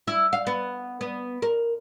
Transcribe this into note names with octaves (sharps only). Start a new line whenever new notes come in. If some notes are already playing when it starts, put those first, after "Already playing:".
E4
F5
B3
B3
A#4